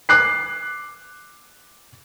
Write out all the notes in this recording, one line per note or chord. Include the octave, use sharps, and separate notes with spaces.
D6 F#6 C7